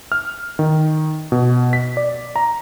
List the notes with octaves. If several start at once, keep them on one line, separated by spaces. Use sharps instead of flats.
F6
D#3
B2
B6
D5
A#5